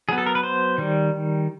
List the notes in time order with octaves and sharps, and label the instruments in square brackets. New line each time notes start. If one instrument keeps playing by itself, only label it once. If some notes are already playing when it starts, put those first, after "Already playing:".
[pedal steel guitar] F#3 B3 G#4
A4
A#4
B4
C5
D#3 G3